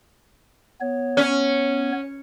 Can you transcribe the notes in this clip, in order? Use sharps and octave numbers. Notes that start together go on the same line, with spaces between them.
B3 C#5
C#4